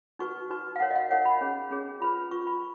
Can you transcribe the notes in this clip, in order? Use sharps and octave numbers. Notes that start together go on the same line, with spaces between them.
D#4 F#4 B4 C#6
D#4 F#4 B4
F5
D#4 A#4 C#5 F#5
D#5
F5
D#4 A#4 C#5 F#5
B5
C#4 G#4 C#5
C#4 G#4 C#5
F4 B4 B5
F4 B4 C#6
B5